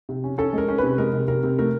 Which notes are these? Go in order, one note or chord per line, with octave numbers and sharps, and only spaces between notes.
C3
C#4
C#4 A4
G#3 A#4
C#4
C3 B4
G#3 A#4
C3
C3 A#4
C3
A3 A#4